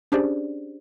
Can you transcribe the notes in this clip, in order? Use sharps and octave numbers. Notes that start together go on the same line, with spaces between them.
C#4 D4 G4 G#4 C5 D5